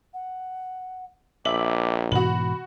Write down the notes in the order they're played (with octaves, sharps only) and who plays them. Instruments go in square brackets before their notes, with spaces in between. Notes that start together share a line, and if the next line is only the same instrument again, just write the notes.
[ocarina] F#5
[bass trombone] A#1 [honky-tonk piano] E5 F#7 [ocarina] D6
[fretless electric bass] G#2 B2 E3 [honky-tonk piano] F#4 F#7 [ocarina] B5